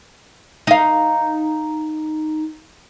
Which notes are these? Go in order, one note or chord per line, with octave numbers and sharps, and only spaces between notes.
D#4 F5